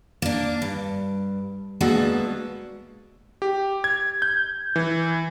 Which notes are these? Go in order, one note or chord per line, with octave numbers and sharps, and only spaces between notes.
A#3 D4
G2
G#3 A#3 B3 D4 F#4 A4
G4
G#6
G6
E3